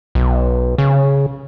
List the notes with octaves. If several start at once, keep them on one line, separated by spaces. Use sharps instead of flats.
B1
C#3